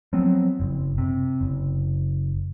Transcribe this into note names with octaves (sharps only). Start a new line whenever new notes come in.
F3 F#3 B3 C4
F#1
C3
F#1